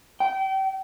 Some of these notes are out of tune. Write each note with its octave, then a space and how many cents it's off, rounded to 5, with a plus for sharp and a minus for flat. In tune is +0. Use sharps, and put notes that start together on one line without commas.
G5 -30